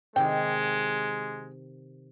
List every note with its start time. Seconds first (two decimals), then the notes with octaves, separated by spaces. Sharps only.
0.16 C3 D#3 G#3 G4 G5